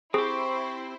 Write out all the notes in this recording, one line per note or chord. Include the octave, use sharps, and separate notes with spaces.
C4 E4 G4 G#4 C5 C#6